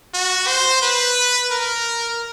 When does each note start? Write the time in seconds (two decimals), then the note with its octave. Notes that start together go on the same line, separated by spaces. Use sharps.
0.14 F#4
0.47 C5
0.82 B4
1.51 A#4